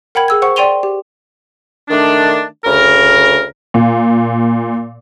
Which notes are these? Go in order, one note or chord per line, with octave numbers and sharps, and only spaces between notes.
A#4 F#5 G5 B5 G#6
G#4 E6 G#6
C5 F#5 C#6
D5 G5 C6 D#7 F7 G7
G4
D#3 A3 D4
D2 C#3 A#4
A#2